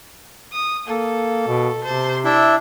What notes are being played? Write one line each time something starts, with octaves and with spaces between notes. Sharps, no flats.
D#6
A#3 A4
B2
C3 C5 A5
D4 E4 E5 G5